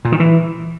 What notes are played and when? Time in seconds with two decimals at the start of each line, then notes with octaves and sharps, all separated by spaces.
0.05 A#2
0.12 D#3
0.20 E3